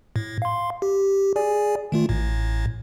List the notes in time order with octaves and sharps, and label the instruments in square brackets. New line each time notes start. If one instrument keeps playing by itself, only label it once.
[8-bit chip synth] A2
F5 C6
G4
G#4 D5 G#5
D#3 A3 F4
A1 A2